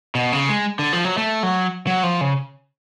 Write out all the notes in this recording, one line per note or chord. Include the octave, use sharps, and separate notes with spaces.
B2
C#3
G#3
D3
F3
F#3
A3
F#3
F#3
F3
C#3